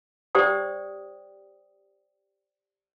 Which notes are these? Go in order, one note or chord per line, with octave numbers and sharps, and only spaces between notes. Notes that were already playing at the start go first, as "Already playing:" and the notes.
G4 C5 D5 G5 D#6